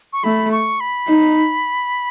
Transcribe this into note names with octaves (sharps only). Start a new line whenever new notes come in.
C#6
A3 B5
C#6
B5
D#4